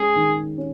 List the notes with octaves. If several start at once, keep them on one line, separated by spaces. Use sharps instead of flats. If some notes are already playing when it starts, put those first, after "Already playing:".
Already playing: G#3 C#4 G#4
D#3
C#4